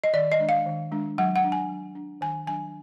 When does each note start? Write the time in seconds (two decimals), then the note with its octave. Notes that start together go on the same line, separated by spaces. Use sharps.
0.04 D#5
0.14 D#3 D5
0.32 D#5
0.39 G#3 D4
0.49 F5
0.66 D#3
0.92 G#3 D4
1.18 F#3 F#5
1.36 F#5
1.44 D4
1.52 G#5
1.69 F#3
1.95 D4
2.21 D#3 G#5
2.47 F#3 D4 G#5